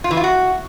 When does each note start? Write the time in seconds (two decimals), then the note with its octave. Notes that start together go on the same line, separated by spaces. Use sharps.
0.04 F4
0.11 E3
0.17 F4
0.24 F#4